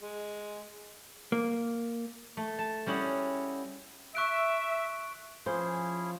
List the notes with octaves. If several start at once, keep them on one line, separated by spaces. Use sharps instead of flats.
G#3
A#3
A3
A5
G3 C#4 E4 F#4 G#4 F#5
E5 C#6 F#6 D7
F3 C#4 E4 G#4 C5